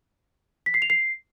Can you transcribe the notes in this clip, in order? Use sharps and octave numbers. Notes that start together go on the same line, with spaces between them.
B6
C7
F7
C7